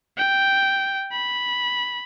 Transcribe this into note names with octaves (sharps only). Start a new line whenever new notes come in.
G5
B5